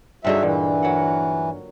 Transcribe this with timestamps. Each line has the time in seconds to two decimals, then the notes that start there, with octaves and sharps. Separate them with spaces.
0.24 G2 D3 F#3 C4 D#4 G#4 E5
0.43 A#2 E3
0.83 F#3 A#4 F#5